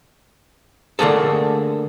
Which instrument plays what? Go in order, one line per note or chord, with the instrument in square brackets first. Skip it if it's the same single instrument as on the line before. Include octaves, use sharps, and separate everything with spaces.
[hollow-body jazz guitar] D3 A3 A#3 G#4 A4